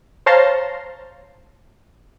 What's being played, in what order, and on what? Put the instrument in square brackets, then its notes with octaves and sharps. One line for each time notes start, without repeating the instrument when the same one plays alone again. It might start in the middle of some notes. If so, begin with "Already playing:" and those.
[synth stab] C5 C#5 F5 A5 A#5 C6